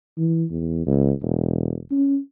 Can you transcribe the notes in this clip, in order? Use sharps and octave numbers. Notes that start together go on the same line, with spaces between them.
E3
E2
C#2
E1
C#4